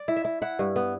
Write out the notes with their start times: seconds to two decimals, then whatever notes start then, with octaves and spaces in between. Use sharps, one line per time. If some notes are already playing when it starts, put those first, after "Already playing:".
Already playing: D5
0.08 E4
0.16 E5
0.25 E4
0.42 E4 F#5
0.59 G2
0.76 B3